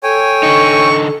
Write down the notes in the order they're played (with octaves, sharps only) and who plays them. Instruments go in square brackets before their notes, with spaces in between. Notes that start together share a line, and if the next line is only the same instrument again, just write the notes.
[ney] A4 [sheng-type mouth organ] C#5 G5 G#5
[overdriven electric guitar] D3 D#4 [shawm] C#6